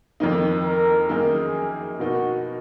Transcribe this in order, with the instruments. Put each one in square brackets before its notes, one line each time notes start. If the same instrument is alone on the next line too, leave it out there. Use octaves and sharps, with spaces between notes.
[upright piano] F2 D#3 A#3 D#4
[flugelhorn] A#4
[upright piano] F#2 D#3 A#3 D#4 [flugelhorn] G#4
[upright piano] B2 A#3 D#4 [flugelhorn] F#4